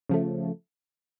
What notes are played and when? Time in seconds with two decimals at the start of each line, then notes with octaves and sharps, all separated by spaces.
0.09 C#3 F3 A3